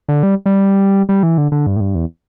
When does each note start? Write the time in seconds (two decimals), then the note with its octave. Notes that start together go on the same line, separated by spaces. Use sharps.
0.08 D3
0.23 G3
0.46 G3
1.09 G3
1.23 E3
1.38 D3
1.52 D3
1.67 G2
1.76 A2
1.81 G2
1.95 E2